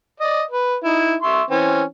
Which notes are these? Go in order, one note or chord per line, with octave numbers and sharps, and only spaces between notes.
D5 D#5
B4
D#4 E4
E5 C6 C#6
E3 C4 C#4